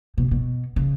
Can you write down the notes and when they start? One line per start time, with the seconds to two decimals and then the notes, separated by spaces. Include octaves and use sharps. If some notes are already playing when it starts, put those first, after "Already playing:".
0.18 B2
0.31 B2
0.76 C#3